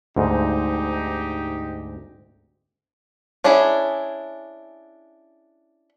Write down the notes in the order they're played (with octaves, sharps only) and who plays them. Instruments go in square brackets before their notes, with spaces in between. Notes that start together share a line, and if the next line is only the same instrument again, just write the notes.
[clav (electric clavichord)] D2 G#2 [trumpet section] D#4 G4
[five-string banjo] C#4 D4 E4 G#4